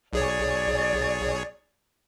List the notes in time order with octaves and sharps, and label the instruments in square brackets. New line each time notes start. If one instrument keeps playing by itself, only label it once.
[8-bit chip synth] B1 G#4 C#5 [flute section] D5